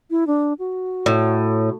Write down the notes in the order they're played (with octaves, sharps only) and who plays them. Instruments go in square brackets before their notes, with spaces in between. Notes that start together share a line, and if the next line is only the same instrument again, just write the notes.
[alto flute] E4
D4
F#4
[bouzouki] A2